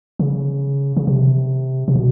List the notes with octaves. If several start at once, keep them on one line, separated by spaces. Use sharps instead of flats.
C#3
C#3
C3
C3
B2